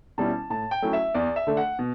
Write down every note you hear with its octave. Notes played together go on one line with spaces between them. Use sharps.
B2 G3 C#4 E4 A5
A2 A5
G5
F#3 A3 C#4 E4
E5
E2 D5
E5
D3 A3 D4
F#5
B2